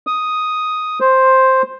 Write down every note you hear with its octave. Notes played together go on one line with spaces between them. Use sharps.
D#6
C5